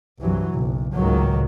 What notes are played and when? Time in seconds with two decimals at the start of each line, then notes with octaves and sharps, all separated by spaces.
0.22 C2 G2 E3 F#3
0.51 F#1 B1
0.93 G#1 C#2 A2 D#3 F#3